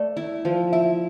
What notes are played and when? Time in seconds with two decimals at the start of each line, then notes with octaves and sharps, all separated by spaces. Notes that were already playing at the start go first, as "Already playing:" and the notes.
Already playing: A3 D5
0.17 E4
0.45 F3
0.72 E4 E5